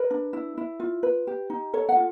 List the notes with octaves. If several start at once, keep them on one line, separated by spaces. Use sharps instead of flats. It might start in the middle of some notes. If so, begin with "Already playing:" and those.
Already playing: A#4 B4
D4
E4
E4
F4
B4
G4
D#4
A4 C#5
F#5
F4